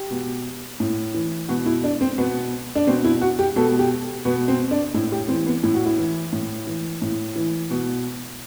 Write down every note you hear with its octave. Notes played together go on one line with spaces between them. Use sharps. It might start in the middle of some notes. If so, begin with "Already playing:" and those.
Already playing: G4
B2
A2
E3
B2 F#4
E4
D4
C4
B2 B3
D4
B2 C4
E4
F#4
G4
B2 A4
G4
B2 B3
C4
D4
A2 E4
G4
E3 C4
B3
A2 E4
F#4
E4
E3
A2
E3
A2
E3
B2